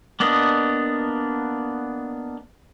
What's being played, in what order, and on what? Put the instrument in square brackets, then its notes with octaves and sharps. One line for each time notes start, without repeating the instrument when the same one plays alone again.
[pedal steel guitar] A#3 B3 D4 D#5